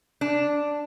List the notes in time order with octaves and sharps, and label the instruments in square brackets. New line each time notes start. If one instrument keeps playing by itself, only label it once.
[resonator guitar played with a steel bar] D4